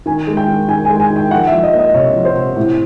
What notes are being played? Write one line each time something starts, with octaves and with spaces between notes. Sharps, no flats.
D#3 G#5
G#3
G5
D#3
D#3 G#5
G#5
G#3
G#5
D#3
G5
F3 F#5
E5
F3
D#5
A#3
D#5
C3 C#5
F3
C5
C3
A2